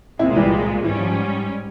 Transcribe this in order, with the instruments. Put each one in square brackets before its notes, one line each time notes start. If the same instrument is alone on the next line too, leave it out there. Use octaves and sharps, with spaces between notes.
[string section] C2 A#2 G#3 [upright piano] C4 E4
[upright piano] E3 G3
[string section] G#2 G3 C#4 [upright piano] E3
[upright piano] F3